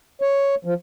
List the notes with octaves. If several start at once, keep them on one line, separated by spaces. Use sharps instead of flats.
C#5
F3